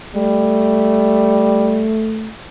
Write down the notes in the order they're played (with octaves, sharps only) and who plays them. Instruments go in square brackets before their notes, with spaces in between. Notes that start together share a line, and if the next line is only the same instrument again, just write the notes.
[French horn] G3 [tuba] A3